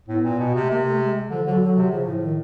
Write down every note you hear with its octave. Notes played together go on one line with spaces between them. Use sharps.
A2 B3
A#2
B2
C3
A3
C3 A#3
A3
G#3
D3 F3
D3 F#3
D3 F#3
C3
C#3 F3
A2
D#3